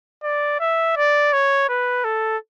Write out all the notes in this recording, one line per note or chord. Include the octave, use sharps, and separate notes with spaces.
D5
E5
D5
C#5
B4
A4